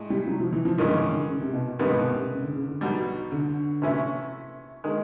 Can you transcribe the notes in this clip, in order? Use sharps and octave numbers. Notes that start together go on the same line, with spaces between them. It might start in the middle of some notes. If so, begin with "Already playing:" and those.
Already playing: A2 G#3
G3
F#3
F3
E3
F3
G2 D#3 F3 G#3 C#4
E3
D3
C#3
C3
B2
G2 C3 D#3 G#3 B3
B2
C3
C#3
D3
C#3
D3
B1 B2 G3
D3
C3 E3 A3 C#4 E4
D#3 G#3